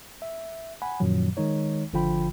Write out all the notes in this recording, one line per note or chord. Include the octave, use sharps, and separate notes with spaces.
E5
F#5 G#5 B5
F#2 A#2 D#3 F3 F#3
D#3 G#3 D#4 C#5
G#1 D3 F3 F4 G5 B5